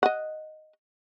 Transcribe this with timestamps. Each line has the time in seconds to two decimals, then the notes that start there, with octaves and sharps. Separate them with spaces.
0.03 D#5 F#5